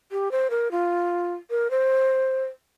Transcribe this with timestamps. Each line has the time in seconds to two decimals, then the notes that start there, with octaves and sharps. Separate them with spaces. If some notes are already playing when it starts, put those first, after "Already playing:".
0.12 G4
0.31 C5
0.50 A#4
0.71 F4
1.50 A#4
1.71 C5